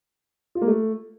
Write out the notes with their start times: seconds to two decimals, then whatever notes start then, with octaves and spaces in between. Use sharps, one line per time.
0.55 F4
0.62 A#3
0.68 A3